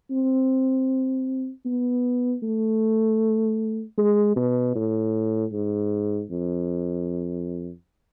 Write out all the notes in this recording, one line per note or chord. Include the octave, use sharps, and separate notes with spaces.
C4
B3
A3
G#3
B2
A2
G#2
F2